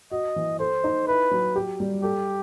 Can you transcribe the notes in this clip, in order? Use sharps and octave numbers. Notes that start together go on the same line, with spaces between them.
F#4 D#5
E3
A4 C5
D#4
E4 B4
F#3
G4
G3
G4 A4